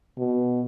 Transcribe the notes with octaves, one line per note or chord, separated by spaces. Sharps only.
B2